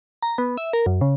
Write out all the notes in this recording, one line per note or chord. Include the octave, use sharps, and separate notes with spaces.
A#5
B3
E5
A#4
F#2
C#3